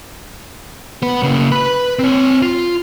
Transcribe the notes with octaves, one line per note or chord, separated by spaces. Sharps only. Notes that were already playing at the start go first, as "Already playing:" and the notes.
B3 B4
C#3 A#3
B4 B5
C4 C#5
F4